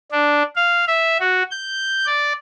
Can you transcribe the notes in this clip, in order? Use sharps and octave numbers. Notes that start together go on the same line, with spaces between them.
D4
F5
E5
F#4
G6
D5